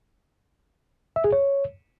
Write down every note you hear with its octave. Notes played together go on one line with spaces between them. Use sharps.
E5
G#4
C#5